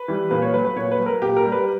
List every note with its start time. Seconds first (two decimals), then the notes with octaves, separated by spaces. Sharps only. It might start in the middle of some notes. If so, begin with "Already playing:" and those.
Already playing: B4
0.08 E3 G3
0.31 A#2 B4
0.42 C#5
0.53 F#3 B4
0.65 B4
0.76 A#2 C#5
0.91 B4
0.99 F#3
1.06 A#4
1.22 A#2 G4
1.37 A#4
1.44 G3
1.52 B4